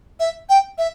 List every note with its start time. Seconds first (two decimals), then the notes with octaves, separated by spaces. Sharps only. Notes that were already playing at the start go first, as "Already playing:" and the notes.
0.20 E5
0.49 G5
0.78 E5